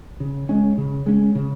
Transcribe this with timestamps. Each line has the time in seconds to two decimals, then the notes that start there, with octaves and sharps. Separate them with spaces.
0.20 C#3
0.49 G#3 C#4
0.78 C#3
1.06 G#3 C#4
1.35 C#3